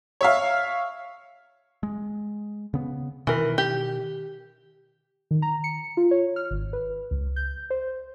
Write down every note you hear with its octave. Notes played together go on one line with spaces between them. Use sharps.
C#5 E5 F5
G#3
C#3 B3
B2 D#3 E3 A#4
G4
D#3
A#5
C#7
F4
C#5
F6
G#1
B4
C#2
G6
C5